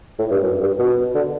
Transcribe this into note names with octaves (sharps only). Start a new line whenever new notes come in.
A2
G2
F#2
G2
B2
D3